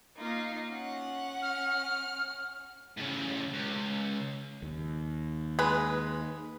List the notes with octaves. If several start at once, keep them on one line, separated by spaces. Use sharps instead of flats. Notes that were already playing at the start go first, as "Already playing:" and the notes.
A#3 D#4 F4
C#4 F#5
F6
A2 C#3
C#2
D#2
G#3 B4